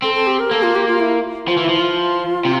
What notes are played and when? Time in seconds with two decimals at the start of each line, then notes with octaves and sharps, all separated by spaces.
0.02 C4 A4
0.15 A4
0.27 G4
0.39 A#4
0.51 A#3 A4
0.63 F4
0.75 G4
0.88 F4
1.00 E4
1.48 F3 F4
1.57 E3
1.64 F3 E4
1.80 F4
2.45 C3